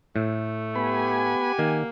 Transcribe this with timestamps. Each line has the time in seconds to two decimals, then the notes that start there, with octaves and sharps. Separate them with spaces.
0.16 A2 A3
0.75 B3 G4 F#5 G#5 B5
1.59 D#3 A#3